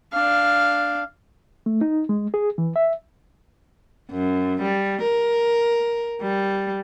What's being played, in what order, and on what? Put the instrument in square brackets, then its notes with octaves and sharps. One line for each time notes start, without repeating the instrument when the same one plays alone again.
[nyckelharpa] D4 F5
[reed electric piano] A3
D#4
G#3
G#4
E3
E5
[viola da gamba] F#2
G3
A#4
G3